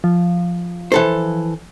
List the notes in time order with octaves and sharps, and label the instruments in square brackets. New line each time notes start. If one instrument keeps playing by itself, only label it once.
[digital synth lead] F3
[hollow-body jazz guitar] E3 A4 C5